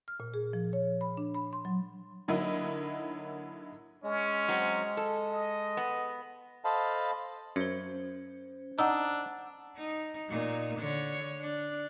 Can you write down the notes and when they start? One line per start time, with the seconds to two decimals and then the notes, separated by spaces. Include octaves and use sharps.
0.08 F6
0.20 A#2
0.34 G#4
0.53 F3
0.73 C#5
1.01 B5
1.17 D4
1.34 B5
1.53 C6
1.65 F#3
2.28 D3 F#3 A#3 D#4 E4
4.04 G#3 C#4
4.49 F#3 C4
4.97 A4
5.30 D#5
5.77 B3
6.64 A4 C5 D#5 F5 A5 B5
7.56 F#2 C#4 C5
8.79 D4 D#4 F#5 E6
9.77 D#4
10.29 A#2 D#4
10.78 D3 C#5
11.39 D4